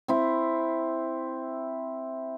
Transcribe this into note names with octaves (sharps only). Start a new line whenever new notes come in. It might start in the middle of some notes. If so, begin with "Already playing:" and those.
C4 E4